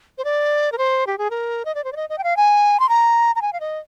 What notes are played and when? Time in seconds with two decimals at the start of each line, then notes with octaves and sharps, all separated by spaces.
0.18 C5
0.25 D5
0.72 A#4
0.78 C5
1.07 G4
1.18 G#4
1.30 A#4
1.65 D#5
1.75 D5
1.84 C5
1.92 D5
1.96 D#5
2.09 D#5
2.18 G5
2.24 F5
2.37 G#5
2.80 C6
2.89 A#5
3.36 A#5
3.42 G#5
3.53 F5
3.60 D#5